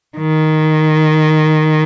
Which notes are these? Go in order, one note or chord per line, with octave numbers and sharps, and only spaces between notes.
D#3